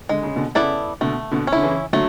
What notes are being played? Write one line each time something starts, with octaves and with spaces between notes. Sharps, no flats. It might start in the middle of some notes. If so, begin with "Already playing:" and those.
D3 G#3
C#3
B2 D3
C#3 B3 E4 A4 D5
B2 D3 A3
B2 D3
C#4
D3 E4
C#3 E3
D3 F#3 A3